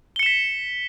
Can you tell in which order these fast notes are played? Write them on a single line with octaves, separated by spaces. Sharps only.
G7 C#7 E7 B6